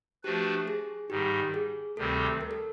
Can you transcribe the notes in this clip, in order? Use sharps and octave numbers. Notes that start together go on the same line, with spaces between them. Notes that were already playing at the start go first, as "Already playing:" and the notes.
F3 A3 D4 F#4 G4 B4
G#4
G#2 D#3 G3 G4
G#4
D2 C3 D#3 G3 C4 A4
A#4
A4